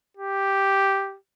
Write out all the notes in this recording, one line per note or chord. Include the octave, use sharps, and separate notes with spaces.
G4